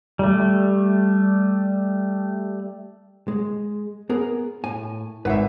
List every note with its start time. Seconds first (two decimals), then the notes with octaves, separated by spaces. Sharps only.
0.19 G3 A3
3.28 G#3
4.09 B3 G#4 A#4
4.64 A2 G#5
5.25 G#1 B4 E5 F#5 G#5